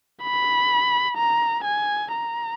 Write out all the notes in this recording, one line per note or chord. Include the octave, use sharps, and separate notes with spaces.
B5
A#5
G#5
A#5